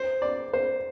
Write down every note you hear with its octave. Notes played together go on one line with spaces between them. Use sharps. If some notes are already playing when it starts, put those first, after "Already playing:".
Already playing: C5
D5
C5